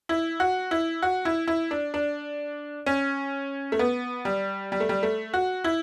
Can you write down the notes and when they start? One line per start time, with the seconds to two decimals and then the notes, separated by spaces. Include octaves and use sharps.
0.09 E4
0.40 F#4
0.71 E4
1.02 F#4
1.25 E4
1.48 E4
1.71 D4
1.94 D4
2.86 C#4
3.72 A3
3.79 B3
4.25 G3
4.72 G3
4.80 A3
4.89 G3
5.03 A3
5.34 F#4
5.64 E4